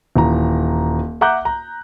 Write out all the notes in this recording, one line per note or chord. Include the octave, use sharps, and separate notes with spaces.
D#1 E3 A#5
E5 F#5 A#5 D6 F#6 G6
A#5